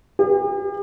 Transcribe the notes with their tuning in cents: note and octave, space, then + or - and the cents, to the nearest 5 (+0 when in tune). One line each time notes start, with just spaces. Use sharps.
G4 +45